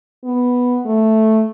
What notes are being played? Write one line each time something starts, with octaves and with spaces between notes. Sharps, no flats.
B3
A3